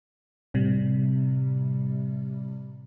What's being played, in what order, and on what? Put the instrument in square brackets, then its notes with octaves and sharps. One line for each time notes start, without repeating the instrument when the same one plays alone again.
[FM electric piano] A2 C3 G3